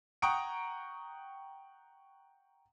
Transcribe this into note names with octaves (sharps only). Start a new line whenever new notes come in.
F#5 G5 A#5 C#6 D#6 D7